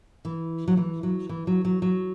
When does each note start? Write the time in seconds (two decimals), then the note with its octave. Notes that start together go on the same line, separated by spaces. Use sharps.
0.25 E3
0.68 F#3
0.77 E3
1.03 F#3
1.29 E3
1.47 F#3
1.65 F#3
1.82 F#3